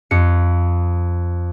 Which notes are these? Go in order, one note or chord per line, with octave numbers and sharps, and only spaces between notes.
F2 C#7